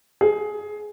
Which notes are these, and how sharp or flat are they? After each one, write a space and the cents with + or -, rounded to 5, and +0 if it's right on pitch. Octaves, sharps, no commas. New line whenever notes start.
G#4 +15